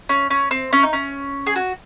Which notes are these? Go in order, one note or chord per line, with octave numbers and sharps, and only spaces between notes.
C#4
C#4
C4
C#4
D#4
C#4
G#4
F#4